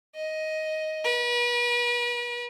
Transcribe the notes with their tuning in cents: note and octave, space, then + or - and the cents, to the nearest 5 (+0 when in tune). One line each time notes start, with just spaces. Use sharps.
D#5 +10
B4 -40